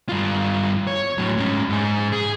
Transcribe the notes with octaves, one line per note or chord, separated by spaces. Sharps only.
G2 F4
C#5
A2 F#3
G#2 C#4
G#2 G#4
G#4